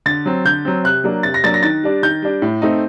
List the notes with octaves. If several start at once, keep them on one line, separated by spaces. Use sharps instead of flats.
D3 A6
F#3 C4
D3 G6
F#3 C4
C3 F#6
F#3 A#3 D4
C3 A6
A#6
F#3 A#3 D4 A6
A#6
D#3 A6
G3 D4
D#3 G6
G3 D4
A2
A3 C4 D#4